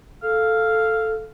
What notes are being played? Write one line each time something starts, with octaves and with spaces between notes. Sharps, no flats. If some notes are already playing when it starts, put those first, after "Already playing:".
A4 F5